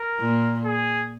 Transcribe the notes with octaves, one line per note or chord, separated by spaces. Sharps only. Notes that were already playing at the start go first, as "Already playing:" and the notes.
Already playing: A#4
A#2
G#4